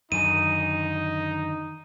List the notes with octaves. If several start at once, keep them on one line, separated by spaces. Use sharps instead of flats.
F#2 D3 D#3 D#4 G#5 D#7